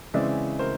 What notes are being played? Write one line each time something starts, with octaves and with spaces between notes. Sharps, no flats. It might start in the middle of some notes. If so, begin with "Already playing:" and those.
C#3 E3 G#3 C4 D5 E5
A#4 C5